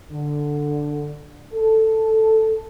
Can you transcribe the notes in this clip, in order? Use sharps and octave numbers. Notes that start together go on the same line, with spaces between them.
D3
A4